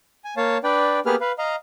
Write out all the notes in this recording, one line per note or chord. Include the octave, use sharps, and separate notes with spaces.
G#5
A#3 C#5 F5 A5
D4 B4 D5 G5
A#3 B3 G4 G#4 B4 F6
B4 F5
D#5 F5 A#5